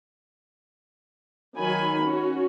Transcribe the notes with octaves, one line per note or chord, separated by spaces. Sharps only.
D#3 F#3 G#5 B5
C#4 F#4